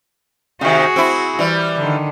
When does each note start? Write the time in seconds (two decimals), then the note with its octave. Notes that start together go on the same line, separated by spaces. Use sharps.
0.61 C3 D#3 F#4 G#4
0.96 C4 E4
1.39 E3 G3
1.77 D3 D#3